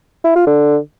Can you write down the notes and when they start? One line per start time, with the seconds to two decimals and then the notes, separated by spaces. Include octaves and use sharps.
0.24 E4
0.35 F4
0.47 D3